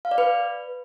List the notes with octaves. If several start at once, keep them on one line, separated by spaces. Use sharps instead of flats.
F5
D5
B4